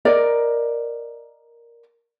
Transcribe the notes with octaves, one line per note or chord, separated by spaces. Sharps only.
A#4 D5 D#5